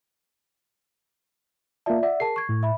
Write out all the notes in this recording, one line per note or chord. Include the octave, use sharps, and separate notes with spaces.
A#3 F4 D5 E5 A5
D5 E5 F#5
G#4 A#4 A5 C7
C#6 G#6
A2
E5 B5